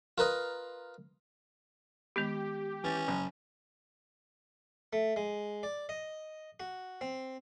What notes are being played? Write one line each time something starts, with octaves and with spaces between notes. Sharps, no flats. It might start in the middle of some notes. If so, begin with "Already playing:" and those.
F4 A#4 B4 D#5
D#3 G#3 B3 G4
E3 C#4 A6
F#1
A3
G#3
D5
D#5
F#4
C4